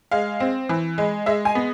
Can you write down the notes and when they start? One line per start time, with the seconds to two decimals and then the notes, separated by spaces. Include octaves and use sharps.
0.11 G#3 F5
0.40 C4
0.69 E3
0.98 G#3
1.26 G#3 E5
1.45 G#5
1.55 B3